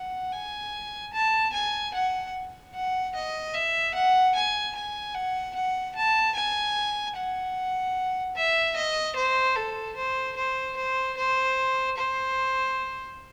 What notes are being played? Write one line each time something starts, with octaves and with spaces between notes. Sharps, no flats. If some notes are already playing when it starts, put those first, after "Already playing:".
Already playing: F#5
G#5
A5
G#5
F#5
F#5
D#5
E5
F#5
G#5
G#5
F#5
F#5
A5
G#5
F#5
E5
D#5
C5
A4
C5
C5
C5
C5
C5